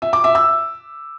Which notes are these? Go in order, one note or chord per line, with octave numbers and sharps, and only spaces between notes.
E5
D6
E5
E6